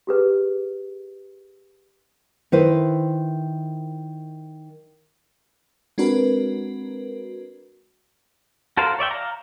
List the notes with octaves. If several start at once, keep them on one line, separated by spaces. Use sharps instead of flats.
G4 G#4 B4
D#3 E4 B4 C5
G#3 C4 D4 F#4 A#4 B4
F#4 A4 A#4 C5 F5
C#5 D5 E5 G5
F5 A#5